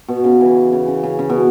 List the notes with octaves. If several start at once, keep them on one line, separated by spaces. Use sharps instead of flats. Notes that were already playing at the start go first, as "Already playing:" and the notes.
B2
C#3
E3
C#3
C#3
C#3
C#3
B2